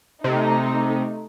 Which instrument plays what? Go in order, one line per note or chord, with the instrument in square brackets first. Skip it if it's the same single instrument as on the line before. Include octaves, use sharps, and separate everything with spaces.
[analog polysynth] C3 [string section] A3 D#4